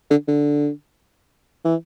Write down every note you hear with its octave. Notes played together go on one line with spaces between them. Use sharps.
D3
D3
E3